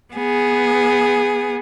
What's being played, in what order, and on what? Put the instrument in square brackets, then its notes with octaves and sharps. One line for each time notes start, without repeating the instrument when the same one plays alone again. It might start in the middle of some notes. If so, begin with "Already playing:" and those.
[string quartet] B3 G#4